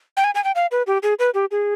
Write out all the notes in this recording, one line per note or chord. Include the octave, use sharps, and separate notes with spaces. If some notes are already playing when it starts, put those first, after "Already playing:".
G5
G#5
G#5
G5
F5
B4
G4
G#4
B4
G4
G#4